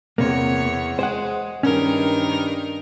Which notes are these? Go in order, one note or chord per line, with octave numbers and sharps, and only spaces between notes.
E2 C3 A#3 C#5
G#3 C5 F#5
G2 D#3 C#4 A#4